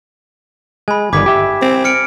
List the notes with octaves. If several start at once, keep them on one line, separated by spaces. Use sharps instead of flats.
G#3 G#5 B5
G1 D#3 D5 D6 G#6 B6
G4 E5
C4
F6 C#7 D7